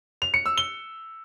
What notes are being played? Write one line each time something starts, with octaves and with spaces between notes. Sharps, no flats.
F7
C#7
E6
G7